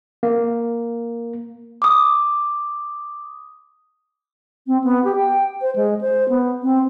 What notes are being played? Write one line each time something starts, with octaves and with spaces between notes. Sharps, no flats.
A#3
D6 D#6
C4
B3
G4
G5
C5
G#3
C5
B3
C4